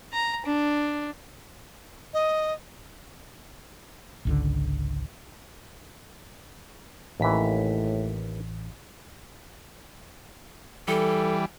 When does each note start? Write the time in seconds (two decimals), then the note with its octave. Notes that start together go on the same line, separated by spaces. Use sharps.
0.13 A#5
0.46 D4
2.14 D#5
4.25 G#1 C#2 D3
7.20 A1 D#2 A2 E3 B6
10.88 E3 G3 A4